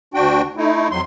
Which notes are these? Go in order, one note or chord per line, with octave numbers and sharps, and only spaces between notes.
D2 D4 F#4 G5
A3 D#4 E4
F2 F#3 C6